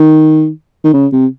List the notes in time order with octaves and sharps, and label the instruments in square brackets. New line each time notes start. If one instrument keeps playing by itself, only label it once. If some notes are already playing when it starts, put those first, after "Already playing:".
Already playing: [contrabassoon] D#3
D#3
C#3
C3